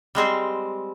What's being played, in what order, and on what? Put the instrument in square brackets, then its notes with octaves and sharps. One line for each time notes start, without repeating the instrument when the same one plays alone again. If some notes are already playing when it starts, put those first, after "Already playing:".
[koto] G3 G#3 C4 C5